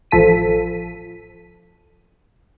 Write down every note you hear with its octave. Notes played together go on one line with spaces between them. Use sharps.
A1 F3 A4 B6 D#7